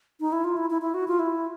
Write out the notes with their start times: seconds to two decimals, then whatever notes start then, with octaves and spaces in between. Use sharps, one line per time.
0.20 D#4
0.32 E4
0.44 F4
0.57 E4
0.70 E4
0.82 E4
0.94 F#4
1.08 F4
1.19 E4